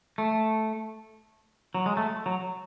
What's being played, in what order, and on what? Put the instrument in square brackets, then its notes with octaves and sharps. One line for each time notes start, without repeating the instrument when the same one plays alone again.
[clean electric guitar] A3
F#3
G#3
A3
F#3